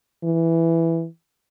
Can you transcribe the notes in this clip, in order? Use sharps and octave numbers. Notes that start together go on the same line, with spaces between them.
E3